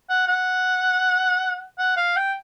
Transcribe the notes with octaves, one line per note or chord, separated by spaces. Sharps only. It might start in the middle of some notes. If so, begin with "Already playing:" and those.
F#5
F#5
F#5
F5
G5